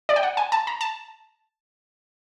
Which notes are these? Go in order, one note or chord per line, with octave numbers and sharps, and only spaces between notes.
D5
G5
F#5
G#5
A5
A#5
A5